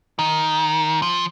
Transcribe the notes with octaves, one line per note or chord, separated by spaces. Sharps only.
D#3
F3